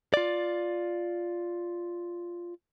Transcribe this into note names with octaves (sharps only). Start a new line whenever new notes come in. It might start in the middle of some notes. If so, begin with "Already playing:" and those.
F4 D5